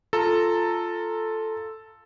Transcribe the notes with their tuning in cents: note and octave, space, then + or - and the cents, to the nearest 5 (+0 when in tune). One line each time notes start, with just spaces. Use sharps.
F4 +0 A4 +0 A#5 -15